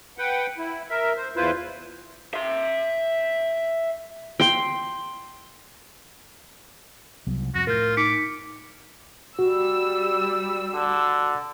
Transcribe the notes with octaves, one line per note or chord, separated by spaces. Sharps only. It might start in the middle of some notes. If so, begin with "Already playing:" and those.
B4 F#5 G5
E4
A#4 E5
C5
E2 E4 F4 B4 C5
E5 C6
G5 C6
C2 F#3 B3
F2 F#4 A#6
A2 F4 A#4 G6
D#4 D6 B6 C#7
G3 F#4 E6
D3